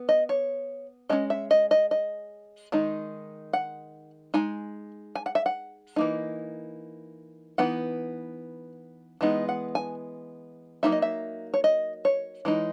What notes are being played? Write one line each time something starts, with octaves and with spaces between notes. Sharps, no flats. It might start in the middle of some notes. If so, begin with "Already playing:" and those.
Already playing: B3
D#5
C#5
G#3 C#4 D#5
E5
D#5
D#5
D#5
D#3 G#3 D#4
F#5
G#3 D#4 G#5
G#5
F#5
E5
F#5
E3 A#3 D#4
E3 B3 D#4 F#5
E3 G#3 B3 D#4
F#5
G#5
F#3 A#3 D#4 E5
D#5
E5
C#5
D#5
C#5
E3 G#3 D#4